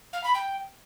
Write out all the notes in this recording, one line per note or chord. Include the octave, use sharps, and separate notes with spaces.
F5
B5
G5